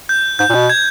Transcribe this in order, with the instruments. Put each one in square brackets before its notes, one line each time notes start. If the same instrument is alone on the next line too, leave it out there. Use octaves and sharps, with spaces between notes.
[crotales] G6
[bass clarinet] G#2 [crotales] G6
[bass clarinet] A#2
B2
[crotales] G#6